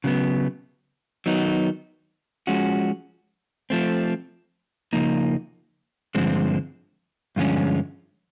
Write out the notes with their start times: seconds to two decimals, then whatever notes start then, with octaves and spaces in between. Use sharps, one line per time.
0.04 C#3 F#3 B3
1.26 D#3 F#3 B3 D#4
2.47 F3 G#3 C#4 F#4
3.70 F3 A3 C4
4.93 C#3 F3 A#3 D#4
6.15 G2 D3 F3 G#3 C4
7.36 G2 D3 F3 G#3 C#4